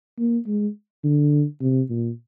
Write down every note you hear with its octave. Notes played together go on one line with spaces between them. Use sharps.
A#3
G#3
D3
C3
A#2